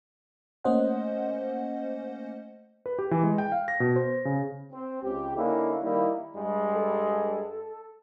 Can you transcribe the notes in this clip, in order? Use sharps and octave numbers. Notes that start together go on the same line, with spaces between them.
A3 A#3 C#4 C5 D#5 F#5
B4
G4
E3
G#3
G5
F5
A#6
B2
C5
C#3
C4
C#2 G4
D3 A#3 C#4 D#4 E4
D#3 G3 A#3 D#4 E4
G2 G3 G#3
A4